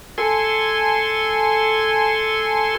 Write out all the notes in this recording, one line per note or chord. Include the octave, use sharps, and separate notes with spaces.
A4 G#5 C6